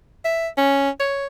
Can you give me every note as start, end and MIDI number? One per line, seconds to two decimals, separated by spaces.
0.25 0.48 76
0.57 0.90 61
1.00 1.27 73